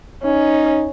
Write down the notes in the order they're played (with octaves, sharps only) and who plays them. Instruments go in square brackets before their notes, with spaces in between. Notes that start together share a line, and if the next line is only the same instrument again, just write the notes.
[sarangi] C#4 [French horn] D#4